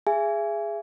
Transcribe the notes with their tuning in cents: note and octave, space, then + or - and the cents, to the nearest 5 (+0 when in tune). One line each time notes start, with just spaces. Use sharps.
G#4 -5 E5 +35 G#5 +0